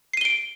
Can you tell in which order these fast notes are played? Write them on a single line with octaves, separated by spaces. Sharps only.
C7 D#7 G7 D7